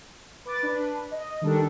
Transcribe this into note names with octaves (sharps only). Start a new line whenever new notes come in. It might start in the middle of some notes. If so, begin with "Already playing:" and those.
B4 D6 A6
D4 B4
D#5
D#3 G3 D4 A4